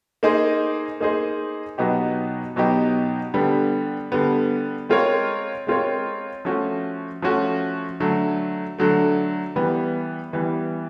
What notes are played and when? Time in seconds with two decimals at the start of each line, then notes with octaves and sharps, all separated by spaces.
0.23 A#3 D#4 G#4 C5 D#5
1.00 A#3 D#4 G#4 C5 D#5
1.78 B2 F#3 B3 D#4 G4
2.56 B2 F#3 B3 D#4 G4
3.34 D3 G3 B3
4.12 D3 G3 B3
4.89 G#3 C4 F4 A#4 C#5
5.67 G#3 C4 F4 A#4 C#5
6.45 F3 A3 C#4 F#4
7.22 F3 A3 C#4 F#4
8.00 D3 F#3 A3
8.78 D3 F#3 A3
9.56 E3 G3 B3
10.33 E3 G3 B3